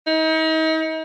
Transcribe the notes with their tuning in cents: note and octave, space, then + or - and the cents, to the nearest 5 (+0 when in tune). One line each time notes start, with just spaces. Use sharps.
D#4 +40